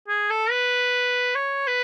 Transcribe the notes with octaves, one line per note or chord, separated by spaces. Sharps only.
G#4
A4
B4
C#5
B4